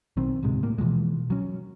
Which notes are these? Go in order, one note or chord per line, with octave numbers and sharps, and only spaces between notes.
B1 D#3 C4
D1 G#2 C3 G#3
A2 A#3
B2 E3 F3 G#3
F#3 C#4